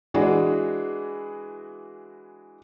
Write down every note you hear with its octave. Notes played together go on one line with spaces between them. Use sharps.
E3 G#3 D4 F#4 G#4